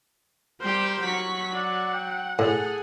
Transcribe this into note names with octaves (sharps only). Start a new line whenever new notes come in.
G3 G4 A#4 C5 G6
F#3 C#6 B6
D5 F#5
G5
A2 G#4 A4 F#5